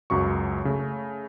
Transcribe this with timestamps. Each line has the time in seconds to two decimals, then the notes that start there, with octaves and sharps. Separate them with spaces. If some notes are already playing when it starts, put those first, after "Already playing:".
0.10 C#2 F#2 F#3 C#6
0.65 C#3 A3